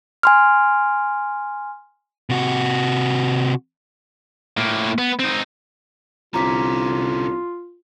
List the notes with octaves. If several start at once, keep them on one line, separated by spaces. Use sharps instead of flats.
G#5 C6 F6
C3 F#4
A2 A#3
B3
C4 D#4
C2 D3 C#4 F4 A#5 D6 B6